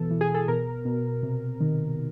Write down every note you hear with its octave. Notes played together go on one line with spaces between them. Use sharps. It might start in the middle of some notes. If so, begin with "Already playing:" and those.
Already playing: B2 E3 A4
E3
G#4
A4
B2 A#4
B2
C3
D#3